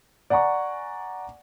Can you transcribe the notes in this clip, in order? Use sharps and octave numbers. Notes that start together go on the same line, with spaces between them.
D5 F#5 G#5 A#5 C#6